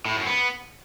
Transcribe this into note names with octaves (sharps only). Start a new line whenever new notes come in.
A2
F#2
B3